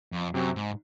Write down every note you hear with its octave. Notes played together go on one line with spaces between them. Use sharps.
F2
F#2 C3 F#3 C4 F#4
G#2